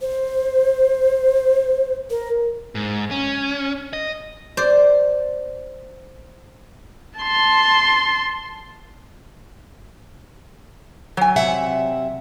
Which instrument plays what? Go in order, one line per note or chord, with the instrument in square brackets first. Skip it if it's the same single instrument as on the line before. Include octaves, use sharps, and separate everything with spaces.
[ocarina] C5
A#4
[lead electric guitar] G#2
C#4
D#5
[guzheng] C5 D5
[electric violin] A5 C6
[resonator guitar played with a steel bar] F#3 G#5
[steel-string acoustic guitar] C3 E5 F#5